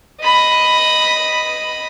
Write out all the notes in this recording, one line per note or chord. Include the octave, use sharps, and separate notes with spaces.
D#5 B5